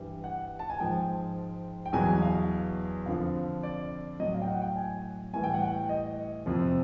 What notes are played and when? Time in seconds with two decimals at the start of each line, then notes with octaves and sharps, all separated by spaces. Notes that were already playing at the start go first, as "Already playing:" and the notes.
Already playing: G2 E3 G3
0.24 F#5
0.59 A5
0.70 G#5
0.80 G#2 F3 G5
1.86 G5
1.93 E2 B2 F#3 G#5
2.22 F5
3.06 F2 D3 F3 F5
3.63 D5
4.20 A2 F#3 D#5
4.34 F5
4.42 G5
4.47 F#5
4.62 G5
4.76 G#5
5.33 A2 E3 G3 G#5
5.44 G5
5.54 F#5
5.64 G5
5.89 D#5
6.46 F2 C3 F3